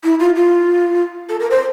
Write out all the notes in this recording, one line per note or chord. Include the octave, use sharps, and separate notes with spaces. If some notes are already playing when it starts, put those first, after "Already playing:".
E4
F4
F4
A4
A#4
C5